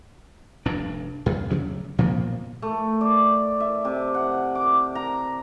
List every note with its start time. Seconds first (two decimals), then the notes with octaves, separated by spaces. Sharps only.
0.66 F1 G2 D4
1.26 F#2
1.50 D2 C#3 F3 F#3
1.98 A#2 F3 A#3 B3
2.62 A3
3.01 D5
3.60 E5
3.85 C3
4.14 F#5
4.55 D6
4.95 A#5